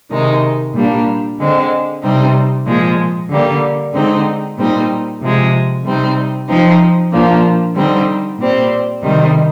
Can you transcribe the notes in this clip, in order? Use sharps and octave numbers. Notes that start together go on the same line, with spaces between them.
C3 D#3 G#3 D#4
A#2 G3 A#3 D4
D3 G#3 C4
C3 G3 C4 D#4
A#2 F3 G#3
D3 G3 A#3
D3 G#3 C4 D#4
A#2 G3 C4 D#4
C3 F3 G#3
C3 G3 C4 D#4
F3 C4 D#4
A#2 F3 A#3 D4
D3 G3 C4 D#4
A#2 G3 C4
C3 D#3 G3 C4 D#4